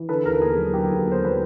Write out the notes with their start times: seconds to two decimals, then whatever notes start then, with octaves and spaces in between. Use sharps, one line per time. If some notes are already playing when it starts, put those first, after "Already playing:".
Already playing: E3
0.09 D3 A4 B4
0.25 D#2 G#4 A#4
0.41 B3 G#4
0.58 F#3
0.74 D3 G4 A4
0.90 D#2
1.07 B3 C5
1.23 F#3 B4